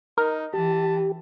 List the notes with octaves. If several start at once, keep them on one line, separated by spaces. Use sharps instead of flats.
D#4 A#4
E3 G4 A5